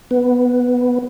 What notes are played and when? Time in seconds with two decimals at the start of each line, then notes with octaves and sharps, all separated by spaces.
0.11 B3